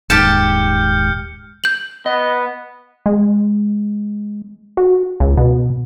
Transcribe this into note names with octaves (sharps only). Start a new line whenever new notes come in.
D#1 G#2 G4 A5 F6 G6 C#7
G6 F#7
B3 D#5
G#3
F#4
C#2
B2